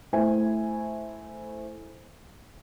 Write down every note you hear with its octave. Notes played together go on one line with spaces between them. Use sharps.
A3 E4 C5 G#5